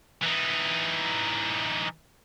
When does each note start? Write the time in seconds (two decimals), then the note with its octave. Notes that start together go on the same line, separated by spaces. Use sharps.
0.22 E3 D#4